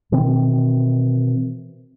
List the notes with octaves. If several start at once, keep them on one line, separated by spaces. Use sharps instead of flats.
B2 D#3 E3 C4